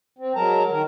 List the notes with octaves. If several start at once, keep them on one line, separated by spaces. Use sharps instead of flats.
C4
F#3 G#3 A#4 A5 A#5
D#3 A#4